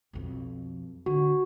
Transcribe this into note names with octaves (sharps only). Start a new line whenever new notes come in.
B1 F2
D3 F#4